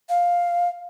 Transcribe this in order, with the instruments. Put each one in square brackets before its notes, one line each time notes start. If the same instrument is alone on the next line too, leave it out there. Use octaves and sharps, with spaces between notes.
[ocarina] F5